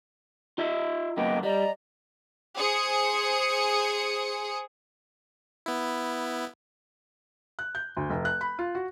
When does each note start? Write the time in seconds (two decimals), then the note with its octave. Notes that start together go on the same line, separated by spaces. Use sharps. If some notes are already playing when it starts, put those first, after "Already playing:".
0.58 F4 D#5 E5
1.17 F#2 A#3 B3 D#5 G5
1.43 G3 D5 D#5 A#5
2.57 G#4 C5 D#6 C#7
5.66 B3 E4
7.59 F#6
7.75 G6
7.97 D2
8.10 F1
8.25 F#6
8.41 B5
8.59 F4
8.75 F#4